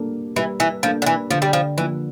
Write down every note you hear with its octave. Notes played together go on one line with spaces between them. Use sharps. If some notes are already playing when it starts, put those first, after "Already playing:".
Already playing: G3 A#3 D4 A4
E3 G3
E3
F3 A#3 D4 A4
D3
E3
D3 F3
G3
F3
E3 F3 A#3